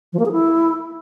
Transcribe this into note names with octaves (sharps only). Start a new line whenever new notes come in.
F3
A#3
G#4
E4